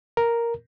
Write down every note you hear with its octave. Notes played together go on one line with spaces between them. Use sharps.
A#4